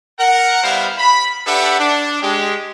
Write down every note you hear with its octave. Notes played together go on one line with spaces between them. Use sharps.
A#4 F#5
G3 B3 E4 C5 F5
B5
D4 G4 A4 B4 E5 F#5
D4
G#3 G4